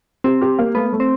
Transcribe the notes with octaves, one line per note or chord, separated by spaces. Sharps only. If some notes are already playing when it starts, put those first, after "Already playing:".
C4 G4
G4
A#3
A3 B3
A3
C4